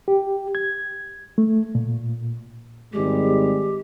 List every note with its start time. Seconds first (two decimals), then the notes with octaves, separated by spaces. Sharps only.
0.08 G4
0.55 G#6
1.38 A3
1.75 A#2
2.93 G#1 G3 G#3 G4